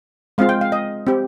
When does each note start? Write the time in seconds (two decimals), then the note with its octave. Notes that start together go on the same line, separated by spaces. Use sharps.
0.38 G#3 C4 F4 F5
0.49 G5
0.61 F5
0.72 D#5
1.07 C4 G4